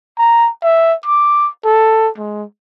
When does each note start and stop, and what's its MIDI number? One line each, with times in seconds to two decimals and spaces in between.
0.18 0.49 82
0.63 0.94 76
1.06 1.48 86
1.65 2.09 69
2.17 2.44 56